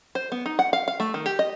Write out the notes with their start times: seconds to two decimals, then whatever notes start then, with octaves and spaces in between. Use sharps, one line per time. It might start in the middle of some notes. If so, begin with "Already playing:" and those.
0.15 C5
0.32 B3
0.46 D#4
0.59 F#5
0.73 F5
0.88 F5
1.00 A3
1.14 D#3
1.26 G4
1.39 D#5